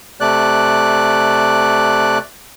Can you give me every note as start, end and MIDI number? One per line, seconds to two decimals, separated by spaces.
0.21 2.18 48
0.21 2.18 57
0.21 2.18 74
0.21 2.18 90